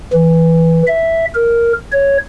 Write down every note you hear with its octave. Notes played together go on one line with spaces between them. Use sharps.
E3
E5
A#4
C#5